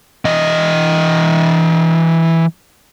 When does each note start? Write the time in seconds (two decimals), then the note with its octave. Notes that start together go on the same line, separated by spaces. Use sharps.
0.25 E3 D#5